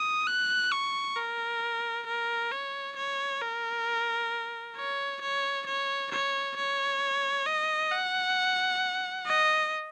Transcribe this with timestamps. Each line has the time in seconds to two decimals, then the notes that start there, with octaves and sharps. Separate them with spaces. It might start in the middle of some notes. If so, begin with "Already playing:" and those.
Already playing: D#6
0.27 F#6
0.72 C#6
1.17 A#4
2.07 A#4
2.52 C#5
2.97 C#5
3.42 A#4
4.77 C#5
5.22 C#5
5.67 C#5
6.12 C#5
6.57 C#5
7.46 D#5
7.92 F#5
9.26 D#5